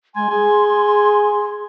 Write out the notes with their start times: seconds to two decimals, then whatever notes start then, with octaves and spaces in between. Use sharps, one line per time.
0.16 G#3 G#5 C6
0.30 G#4 G#5